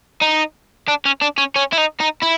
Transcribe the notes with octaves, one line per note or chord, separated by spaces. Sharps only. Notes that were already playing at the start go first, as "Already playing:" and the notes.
D#4
D4
C#4
D4
C#4
C#4
E4
D#4
D#4
E4